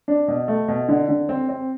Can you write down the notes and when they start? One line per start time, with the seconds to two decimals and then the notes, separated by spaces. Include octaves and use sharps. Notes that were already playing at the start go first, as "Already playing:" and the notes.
0.08 D4
0.28 B2
0.48 A3
0.68 B2
0.88 D3
1.08 D3
1.29 C4
1.49 C4